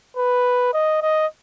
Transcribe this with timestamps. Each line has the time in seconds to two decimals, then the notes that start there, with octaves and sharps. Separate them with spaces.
0.17 B4
0.74 D#5
1.02 D#5